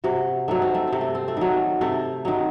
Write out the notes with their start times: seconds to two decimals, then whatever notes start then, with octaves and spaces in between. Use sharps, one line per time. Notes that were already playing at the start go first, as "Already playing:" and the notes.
0.04 C3 F#4
0.48 D#3 F#3 A3
0.62 C4
0.75 A3
0.87 C4
0.93 C3
1.01 A3
1.15 C4
1.28 A3
1.37 D#3 F#3
1.81 C3 A3
2.25 D#3 F#3